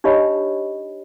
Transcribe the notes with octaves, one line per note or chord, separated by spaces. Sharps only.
D4 D#4 G4 C#5 D#5 B5